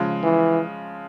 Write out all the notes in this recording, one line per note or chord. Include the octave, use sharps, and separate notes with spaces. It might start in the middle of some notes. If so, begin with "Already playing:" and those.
Already playing: C#3 F3 G#3
E3